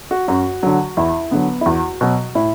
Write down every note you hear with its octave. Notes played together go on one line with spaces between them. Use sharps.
F#4
F#2 F#4
D3 F#3
E2 E4
D3 F#3 B3
E4
E2 F#4
B2 F#3
A2 E4